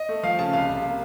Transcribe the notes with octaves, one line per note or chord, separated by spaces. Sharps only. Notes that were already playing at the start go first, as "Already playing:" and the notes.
Already playing: D#5
A3
F3 F5
C#3 A5
C2 F5
C2
A#3